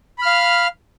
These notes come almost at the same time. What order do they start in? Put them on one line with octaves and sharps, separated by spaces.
B5 F6 F5